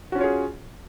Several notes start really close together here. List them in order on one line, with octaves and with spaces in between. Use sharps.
F#4 C#4 F4 C#5 G#4